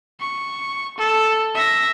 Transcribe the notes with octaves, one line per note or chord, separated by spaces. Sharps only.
C#6
A4
E5 A#6